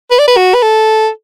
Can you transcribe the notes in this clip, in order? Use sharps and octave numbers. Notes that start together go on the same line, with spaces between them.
B4
D5
B4
F#4
B4
A4